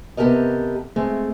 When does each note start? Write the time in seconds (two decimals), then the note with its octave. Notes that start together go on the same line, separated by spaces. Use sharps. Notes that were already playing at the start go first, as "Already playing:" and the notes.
0.17 C3 B3 G4 A4 A#4 D#5
0.96 G#3 A3 C4